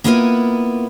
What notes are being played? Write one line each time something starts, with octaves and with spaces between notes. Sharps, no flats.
A#3 B3 E4 F4 A#4 B4